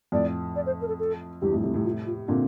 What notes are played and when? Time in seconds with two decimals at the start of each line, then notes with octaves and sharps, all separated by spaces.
0.12 F2 A2 D5
0.56 D5
0.66 C5
0.81 A#4
0.88 A4
0.99 A4
1.42 E2 G2 G4
1.52 F2 A2
1.63 A2 C3
1.74 A2 C3
1.84 F4
2.06 F4
2.28 A#2 D3 C4